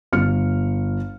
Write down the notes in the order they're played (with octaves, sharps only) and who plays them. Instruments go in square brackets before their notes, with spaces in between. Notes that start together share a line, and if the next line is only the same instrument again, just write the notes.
[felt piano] G1 F6 C#7